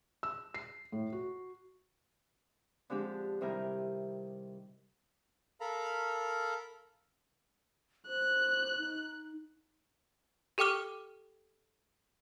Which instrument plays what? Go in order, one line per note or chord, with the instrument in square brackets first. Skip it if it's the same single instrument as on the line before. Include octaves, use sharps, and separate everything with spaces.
[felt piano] E6
C7
A2
F#4
[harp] D3 F3 G#3 C4 D4 G4
C3 D#3 G3 E4 A#4 F6
[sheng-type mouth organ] A4 A#4 F5 A#5 B5
[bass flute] C5 [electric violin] F#6
[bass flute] D#4
[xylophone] G4 A4 G5 D6 F6 G7